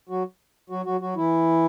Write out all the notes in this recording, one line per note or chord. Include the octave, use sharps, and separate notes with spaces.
F#3 F#4
F#3 F#4
F#3 F#4
F#3 F#4
E3 E4